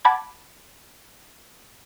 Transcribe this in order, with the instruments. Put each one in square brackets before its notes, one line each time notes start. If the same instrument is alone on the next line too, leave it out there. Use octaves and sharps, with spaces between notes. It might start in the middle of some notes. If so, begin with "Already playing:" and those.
[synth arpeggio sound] F#5 A5 B5 D6 G#6